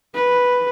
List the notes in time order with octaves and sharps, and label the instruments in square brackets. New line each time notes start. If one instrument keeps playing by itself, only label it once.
[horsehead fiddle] B4